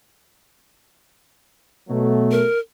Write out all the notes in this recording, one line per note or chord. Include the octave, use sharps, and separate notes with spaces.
B2 F#3 A3
A#4